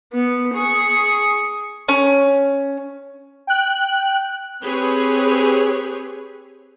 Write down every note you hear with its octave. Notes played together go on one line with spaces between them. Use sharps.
B3
G#4 C#6
C#4
G5 F#6
C4 G4 G#4 B4 C#5